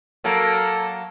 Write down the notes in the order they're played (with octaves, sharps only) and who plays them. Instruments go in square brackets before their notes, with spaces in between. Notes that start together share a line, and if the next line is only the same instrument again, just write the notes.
[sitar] F#3 A#3 [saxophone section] A4